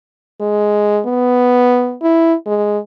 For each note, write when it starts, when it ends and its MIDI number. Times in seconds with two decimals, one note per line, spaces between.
0.41 1.01 56
1.06 1.96 59
2.02 2.34 64
2.46 2.79 56